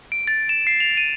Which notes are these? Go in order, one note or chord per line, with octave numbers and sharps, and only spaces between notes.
D7
A6
E7
C7
F7
D#7